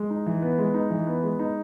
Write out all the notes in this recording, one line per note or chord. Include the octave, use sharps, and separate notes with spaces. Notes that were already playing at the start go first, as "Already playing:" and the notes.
Already playing: G#3
D#4
E3
B3
G#3
D#4
E3
B3
G#3
D#4